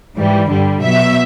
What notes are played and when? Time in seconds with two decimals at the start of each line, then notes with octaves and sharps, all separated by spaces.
0.17 G#2 E3 G3
0.50 G2 D3 G3
0.83 B2 F#3 E5